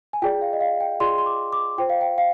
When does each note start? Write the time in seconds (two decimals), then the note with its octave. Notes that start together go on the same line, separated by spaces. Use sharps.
0.13 G#5
0.22 F4 G#4 D5 G5
0.41 F5
0.53 D#5
0.60 F5
0.81 G5
1.00 F4 G#4 D5 C6
1.18 C6
1.26 D6
1.53 D6
1.78 F4 C5 G5
1.90 F5
2.01 G5
2.18 F5